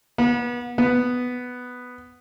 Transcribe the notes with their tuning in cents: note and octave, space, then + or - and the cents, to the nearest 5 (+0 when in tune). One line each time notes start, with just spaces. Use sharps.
B3 -30
B3 +5